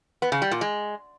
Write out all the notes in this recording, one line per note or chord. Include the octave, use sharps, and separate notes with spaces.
B3
C#3
G3
A#2
G#3